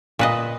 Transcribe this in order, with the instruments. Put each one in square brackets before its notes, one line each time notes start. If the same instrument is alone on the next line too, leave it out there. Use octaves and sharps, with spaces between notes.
[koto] A#2 B4 D#5